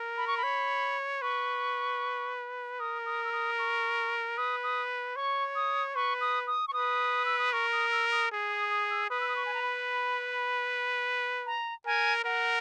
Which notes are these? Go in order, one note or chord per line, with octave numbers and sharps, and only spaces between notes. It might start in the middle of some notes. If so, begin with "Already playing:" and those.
Already playing: A#4
B5
C#6
B5
C#5
B4 C#6
A#4 D#6
D#6
E6
D#6
C#6
B4 D#6
D#6
C#5 C#6
D#6
B4 C#6
D#6
D#6
C#6
B4 D#6
E6
D#6
A#4 C#6
D#6
E6
D#6
G#4
D#6
D#6
E6
B4 D#6
E6
D#6
C#6
G#5
A#5
B5
A#5
A#4 G#5
A#4 F#5